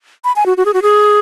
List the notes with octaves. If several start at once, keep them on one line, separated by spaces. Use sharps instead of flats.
B5
G#5
F#4
F#4
G#4
F#4
G#4